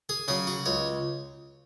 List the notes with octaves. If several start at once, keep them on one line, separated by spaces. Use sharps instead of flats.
G#4
C#3 F#3 G#4
F#4
C#2 C#5